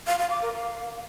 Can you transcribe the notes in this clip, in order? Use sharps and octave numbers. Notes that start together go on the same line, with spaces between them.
F5
F5
D6
A#4
F5